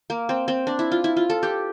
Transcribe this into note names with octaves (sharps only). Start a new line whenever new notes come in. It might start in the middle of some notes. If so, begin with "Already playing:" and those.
A#3
C4
C4
D4
E4
F4
E4
F4
A4
G4